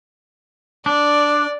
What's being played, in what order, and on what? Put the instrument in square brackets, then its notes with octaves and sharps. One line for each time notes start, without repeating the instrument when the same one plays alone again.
[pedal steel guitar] D4 [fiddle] D5